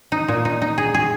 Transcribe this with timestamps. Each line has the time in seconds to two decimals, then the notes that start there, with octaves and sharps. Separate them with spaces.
0.12 D#4
0.28 A#2
0.45 D#4
0.62 D#4
0.78 G#4
0.94 G#4